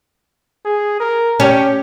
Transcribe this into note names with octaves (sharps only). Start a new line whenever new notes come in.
G#4
A#4
C#4 G4